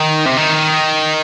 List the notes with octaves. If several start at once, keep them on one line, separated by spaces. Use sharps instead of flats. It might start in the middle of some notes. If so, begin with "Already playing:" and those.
Already playing: D#3
C3
D#3